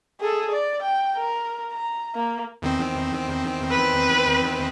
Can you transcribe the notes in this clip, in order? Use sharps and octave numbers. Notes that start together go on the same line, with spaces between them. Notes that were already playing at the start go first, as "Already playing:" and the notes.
G#4 A4
D5
G5
A#4
A#5
A#3
E2 D#3 C4
B4